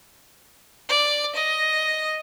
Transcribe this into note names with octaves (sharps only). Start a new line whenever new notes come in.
D5
D#5